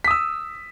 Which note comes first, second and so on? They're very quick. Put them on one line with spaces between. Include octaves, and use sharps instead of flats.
B6 D#6 E6